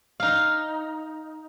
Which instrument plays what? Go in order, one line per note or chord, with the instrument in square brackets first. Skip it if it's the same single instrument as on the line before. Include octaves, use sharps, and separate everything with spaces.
[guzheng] D#4 F5